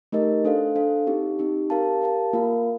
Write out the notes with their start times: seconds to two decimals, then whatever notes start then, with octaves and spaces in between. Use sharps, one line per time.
0.12 A3 D#4 G4 A#4 D#5
0.44 D4 A4 C5 F5
0.76 D4 A4 C5 F5
1.07 C4 D#4 G4
1.39 C4 D#4 G4
1.70 G4 A#4 F5 A5
2.02 G4 A#4 F5 A5
2.33 A#3 F4 A#4 F5